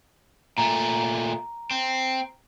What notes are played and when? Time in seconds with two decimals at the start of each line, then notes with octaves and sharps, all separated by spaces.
0.58 A#2 A3 A#5
1.71 C4